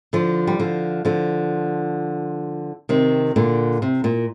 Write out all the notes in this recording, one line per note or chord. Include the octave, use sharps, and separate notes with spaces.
D3 F3
G3
D3 F3
D3 F3
C3 D#3
A#2 D3
C3
A#2